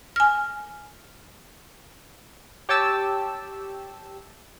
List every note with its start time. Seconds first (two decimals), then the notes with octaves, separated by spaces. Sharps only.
0.16 G#5 F6
2.69 G4 C#5 G5 A5 E6